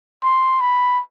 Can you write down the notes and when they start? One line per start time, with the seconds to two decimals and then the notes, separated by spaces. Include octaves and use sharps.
0.23 C6
0.61 B5